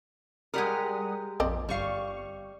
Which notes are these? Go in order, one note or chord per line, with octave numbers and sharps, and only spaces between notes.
G3 G#3 G4 A#4 F#5 D#6
A#1 F2 C4 D5 D#5
G1 G3 F5 C#6